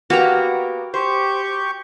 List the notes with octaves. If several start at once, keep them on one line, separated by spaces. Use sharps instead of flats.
A#3 B3 F#4 G4 A#5
G4 C5 C#6 G6